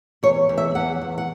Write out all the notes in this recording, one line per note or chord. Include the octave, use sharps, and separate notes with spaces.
E2 C#5
E2
E5
E2 F#5
E2
F#5